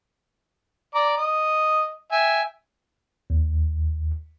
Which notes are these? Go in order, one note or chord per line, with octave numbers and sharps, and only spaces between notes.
D5 A#5 D6
D#5
E5 G5 G#5
D#2